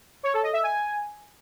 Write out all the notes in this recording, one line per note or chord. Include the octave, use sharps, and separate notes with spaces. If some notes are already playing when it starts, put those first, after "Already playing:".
C#5
A4
D#5
E5
G#5